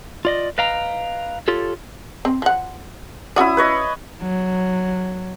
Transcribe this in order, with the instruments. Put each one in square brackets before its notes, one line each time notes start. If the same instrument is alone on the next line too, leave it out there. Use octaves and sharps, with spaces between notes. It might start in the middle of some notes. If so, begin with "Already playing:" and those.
[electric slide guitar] F4 D5 D#5
B4 D#5 F5 G5 A#5
F4 G4 A4 C#5
[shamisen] C4
F3 F#5
[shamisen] C#4 F#4 D5 [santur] E4 D#6
[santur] B4 C#5 D#5
[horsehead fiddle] F#3